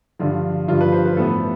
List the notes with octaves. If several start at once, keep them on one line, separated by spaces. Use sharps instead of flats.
G2 D3 F3 F4
G2 D3 F3 F4
B4
C5
B4
A2 E3 B3 A4